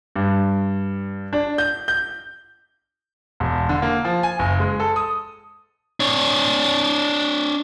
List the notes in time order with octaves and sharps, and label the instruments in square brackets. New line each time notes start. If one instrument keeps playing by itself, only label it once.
[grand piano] G2
D4
G6
G6
E1
D3
A#3
F3
G#5
F#1
G#3
A4
D#6
[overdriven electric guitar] D4 C#5